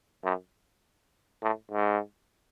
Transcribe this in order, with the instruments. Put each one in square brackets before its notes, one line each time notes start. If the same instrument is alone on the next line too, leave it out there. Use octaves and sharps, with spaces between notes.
[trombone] F#2
A2
G#2